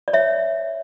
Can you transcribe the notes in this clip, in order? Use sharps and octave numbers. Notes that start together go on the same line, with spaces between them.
D5
C#5 E5